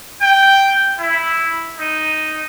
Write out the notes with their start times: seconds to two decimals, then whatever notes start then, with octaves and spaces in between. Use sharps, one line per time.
0.20 G5
0.98 E4
1.79 D#4